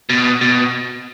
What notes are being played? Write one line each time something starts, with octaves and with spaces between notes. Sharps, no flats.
B2
B2